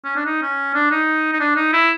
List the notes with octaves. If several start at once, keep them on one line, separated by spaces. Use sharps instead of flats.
C#4
D4
D#4
C#4
D4
D#4
D#4
D4
D#4
E4